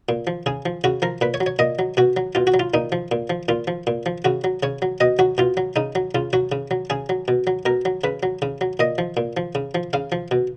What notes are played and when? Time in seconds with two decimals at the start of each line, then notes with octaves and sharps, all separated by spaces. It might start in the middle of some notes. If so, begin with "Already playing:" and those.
0.09 A#2
0.27 F3
0.46 C#3 G#4
0.66 F3
0.84 C#3 F#4
1.02 F3 A#4
1.21 A#2 B4
1.34 C#5
1.41 F#3
1.46 C#5
1.59 A#2 D#5
1.79 F#3
1.97 B2 F#4
2.17 F#3
2.35 B2 F4
2.47 F#4
2.54 F#3
2.60 F4
2.74 A#2 D#4
2.92 F3
3.12 A#2
3.30 F3
3.48 A#2 F4
3.68 F3
3.87 A#2
4.06 F3
4.25 C#3 F#4
4.44 F#3
4.63 C#3 C#5
4.82 F#3
5.00 B2 D#5
5.19 F#3 F#4
5.38 B2 F4
5.57 F#3
5.76 C#3 D#4
5.95 F#3
6.15 C#3 F4
6.33 F#3 F#4
6.52 C#3
6.71 F#3
6.90 C#3 G#4
7.09 F#3
7.28 B2
7.47 F#3
7.66 B2 A#4
7.85 F#3
8.04 C#3 B4
8.23 F#3
8.42 C#3
8.61 F#3
8.79 A#2 D#5
8.98 F3
9.17 A#2
9.37 F3
9.55 C#3
9.75 F3
9.93 C#3 F5
10.12 F3
10.31 B2